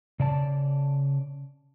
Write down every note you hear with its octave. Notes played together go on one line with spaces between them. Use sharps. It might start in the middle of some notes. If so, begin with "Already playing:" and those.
C#3 D5 A5